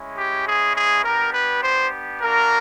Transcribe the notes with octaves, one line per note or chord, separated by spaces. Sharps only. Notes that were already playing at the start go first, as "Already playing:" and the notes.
Already playing: G#3 C#4 E4
G4
G#4
G#4
B3 D4 G4 A#4
B4
C5
A#3 D4 F#4 A#4